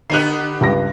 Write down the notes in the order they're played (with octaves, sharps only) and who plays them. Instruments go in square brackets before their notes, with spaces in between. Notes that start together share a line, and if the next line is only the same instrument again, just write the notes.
[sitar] D3 B3 G4 [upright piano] F#6 C7
[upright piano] C#2 G2 A#6